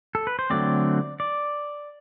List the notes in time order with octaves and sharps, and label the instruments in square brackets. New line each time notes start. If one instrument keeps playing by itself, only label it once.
[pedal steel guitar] A4
B4
C5
D3 F#3 A3 C4 D5
D5